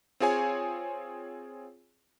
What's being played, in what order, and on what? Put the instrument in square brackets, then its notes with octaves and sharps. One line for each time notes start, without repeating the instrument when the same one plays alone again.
[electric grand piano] C4 F4 G#4 C#5 G#5